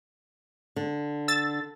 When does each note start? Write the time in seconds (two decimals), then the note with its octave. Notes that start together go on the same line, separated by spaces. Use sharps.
0.76 D3
1.28 E6 A6